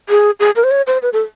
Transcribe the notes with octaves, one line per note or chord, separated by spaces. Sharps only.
G#4
G#4
A#4
C5
C#5
C5
B4
A4